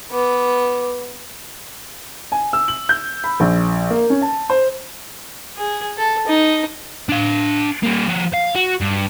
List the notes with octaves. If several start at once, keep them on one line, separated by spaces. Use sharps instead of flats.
B3 D6
G#5
E6
F#7
G6
B5
A#1
A#3
C#4
A5
C5
G#4
A4
D#4
D4 F5
G3 A#3
F3 F#4
F5
F#4
G2